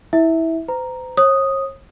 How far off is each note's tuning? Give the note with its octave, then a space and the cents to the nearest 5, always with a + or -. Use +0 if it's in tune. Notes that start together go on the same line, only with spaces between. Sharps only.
E4 -20 E5 -10
C5 -45 A#5 +0
C#5 -40 D#6 +0